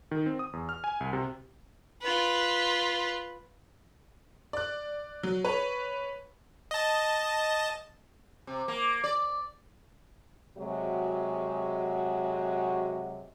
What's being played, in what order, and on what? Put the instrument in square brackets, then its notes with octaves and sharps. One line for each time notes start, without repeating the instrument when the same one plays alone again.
[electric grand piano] D#3
C4
D#6
E2
F6
G#5
C2
C3
[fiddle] F4 B4
[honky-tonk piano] D5 F#6
F#3
B4 C#5
[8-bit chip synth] D#5 A5
[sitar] C3
A#3
D5
[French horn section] C3 F#3 G#3 F#4